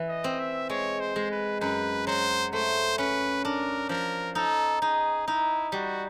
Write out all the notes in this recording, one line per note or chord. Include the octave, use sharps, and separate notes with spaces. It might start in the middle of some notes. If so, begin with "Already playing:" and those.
Already playing: E3 E4
D#5
C4
E5
G#3 C#5
C5
G#3
B4
F#2 B4
F#3 C5
A3 C5
C#4 B4
D4 A#4
F3 A#4
D#4 A4
D#4 G#4
D#4 E4
G3 F#4